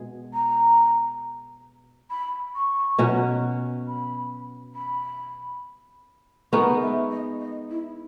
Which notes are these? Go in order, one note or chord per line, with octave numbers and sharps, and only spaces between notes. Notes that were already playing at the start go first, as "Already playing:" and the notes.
Already playing: B2 G#3 G#4
A#5
B5
C#6
B2 F#3 C#4 F#4
B5
B5
G#3 B3 D#4 A#4 C#6
E5
D#5
D#5
E4